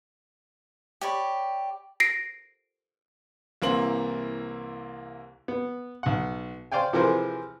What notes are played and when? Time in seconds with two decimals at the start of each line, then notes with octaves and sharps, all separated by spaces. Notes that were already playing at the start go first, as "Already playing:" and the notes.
1.01 G4 C#5 D5 B5
2.00 A#6 C7 D7
3.62 C2 E3 A#3 C4 C6 F#7
5.48 B3
6.03 B1 F#5
6.72 C5 D5 F5 G5 G#5
6.93 C3 E3 F3 G#4 A#4 C5